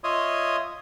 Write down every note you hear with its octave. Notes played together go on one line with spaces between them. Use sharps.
F4 C#5 D#5 E5 C6 D#6